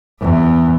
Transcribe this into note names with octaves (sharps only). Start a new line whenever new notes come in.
E2